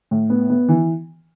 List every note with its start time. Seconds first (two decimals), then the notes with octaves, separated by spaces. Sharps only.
0.11 A2
0.30 B3
0.50 B3
0.69 E3